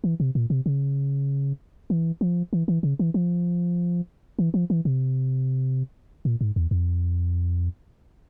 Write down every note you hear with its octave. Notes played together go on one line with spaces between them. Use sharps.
E3
C3
A#2
C3
C#3
E3
F3
E3
E3
C#3
E3
F3
E3
F3
E3
C3
A#2
G#2
E2
F2